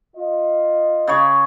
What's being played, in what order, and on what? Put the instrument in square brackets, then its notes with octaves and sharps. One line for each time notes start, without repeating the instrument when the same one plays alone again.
[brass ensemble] F4 D#5
[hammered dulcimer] C#3 G#4 C#5